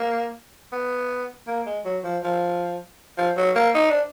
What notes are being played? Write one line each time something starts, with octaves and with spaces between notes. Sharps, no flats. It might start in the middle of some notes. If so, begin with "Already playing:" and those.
Already playing: A#3
B3
A#3
G#3
F#3
F3
F3
F3
F#3
A#3
D#4
D4